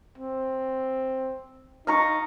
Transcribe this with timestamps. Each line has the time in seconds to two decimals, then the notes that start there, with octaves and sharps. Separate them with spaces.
0.18 C4
1.87 D#4 F5 A#5 C#6